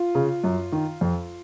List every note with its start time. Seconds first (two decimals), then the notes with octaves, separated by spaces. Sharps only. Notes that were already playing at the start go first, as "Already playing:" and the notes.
Already playing: F4
0.15 C#3
0.44 F#2
0.72 D#3
1.01 F2